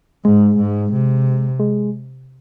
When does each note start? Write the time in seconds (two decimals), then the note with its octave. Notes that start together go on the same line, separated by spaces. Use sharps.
0.24 G#2 G#3
0.58 G#2
0.92 C3
1.60 G#3